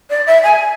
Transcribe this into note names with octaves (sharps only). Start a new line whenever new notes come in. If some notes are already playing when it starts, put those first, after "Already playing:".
D5
E5
G#5